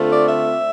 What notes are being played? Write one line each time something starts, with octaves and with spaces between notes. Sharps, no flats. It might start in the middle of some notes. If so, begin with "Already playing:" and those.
Already playing: D3 A3 C4 F4
D5
E5